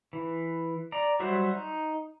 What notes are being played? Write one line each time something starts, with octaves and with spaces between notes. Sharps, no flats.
E3
D5 A#5
F#3 G3 F#4 C5 E5
D#4